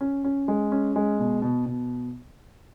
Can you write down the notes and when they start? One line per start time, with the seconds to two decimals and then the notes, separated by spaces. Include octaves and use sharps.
0.01 C#4
0.24 C#4
0.48 G#3
0.72 C#4
0.96 G#3
1.19 B2
1.42 B2
1.66 B2